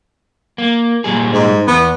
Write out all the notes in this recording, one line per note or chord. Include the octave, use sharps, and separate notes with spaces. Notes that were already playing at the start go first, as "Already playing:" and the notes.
A#3
A#2 G3 G#4
G#2
E2 B3